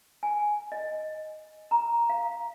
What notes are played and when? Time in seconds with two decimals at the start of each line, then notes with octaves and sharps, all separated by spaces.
0.23 G#5
0.72 D#5
1.71 A#5
2.10 F5